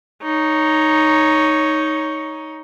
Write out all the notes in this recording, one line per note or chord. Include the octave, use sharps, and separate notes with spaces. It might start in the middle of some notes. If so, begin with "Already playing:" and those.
D#4 C#5